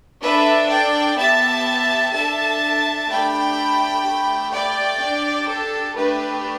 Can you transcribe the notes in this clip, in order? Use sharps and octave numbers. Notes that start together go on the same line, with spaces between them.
D4 A4 B4 E5
D5 G5
B3 G4 E5 A5
D4 A4 E5 A5
A3 D4 G4 G5 B5
A3 G4
D5 G5
D4 G4
A4
A3 D4 G4 B4